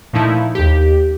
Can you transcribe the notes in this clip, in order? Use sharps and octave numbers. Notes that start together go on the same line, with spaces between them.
A#2 F3 A3 D#4 E4
D#2 G4